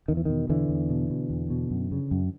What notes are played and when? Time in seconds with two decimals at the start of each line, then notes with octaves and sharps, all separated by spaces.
0.08 E2 D#3
0.17 E3
0.25 B2 D#3
0.49 E2 D3 E3
0.69 E2
0.90 B2
1.10 B2
1.30 E2
1.50 B2
1.71 F#2
1.92 C#3
2.11 F#2